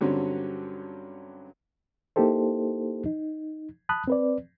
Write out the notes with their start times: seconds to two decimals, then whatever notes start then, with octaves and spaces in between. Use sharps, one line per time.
0.01 G2 D3 F#3 C4 C#4
2.16 A#3 D#4 E4 G4 A4 C5
3.06 D#4
3.89 A5 B5 D#6 F#6
4.08 C4 B4 D5